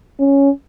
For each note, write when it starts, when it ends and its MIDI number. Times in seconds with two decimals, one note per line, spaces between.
0.20 0.50 61